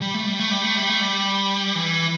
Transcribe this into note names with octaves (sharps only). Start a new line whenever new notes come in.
G3
A3
G3
A3
G3
A3
G3
A3
G3
E3